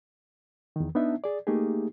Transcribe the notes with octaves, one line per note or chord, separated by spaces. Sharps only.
E2 D#3
B3 D4 D#4 E5
G#4 D5
A3 A#3 D#4 G4 G#4